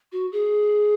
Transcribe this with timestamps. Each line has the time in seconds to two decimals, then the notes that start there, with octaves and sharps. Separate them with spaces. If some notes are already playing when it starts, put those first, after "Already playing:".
0.12 F#4
0.32 G#4